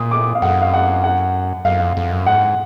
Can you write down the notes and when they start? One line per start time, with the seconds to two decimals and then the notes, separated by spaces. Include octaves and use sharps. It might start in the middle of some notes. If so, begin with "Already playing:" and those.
Already playing: A#2 D#6
0.11 D6
0.35 F5
0.42 F#2 F#5
0.62 F5
0.73 F#5
1.04 F#5
1.65 F#2 F5
1.80 F2
1.97 F2
2.12 F#2
2.26 G#2 F#5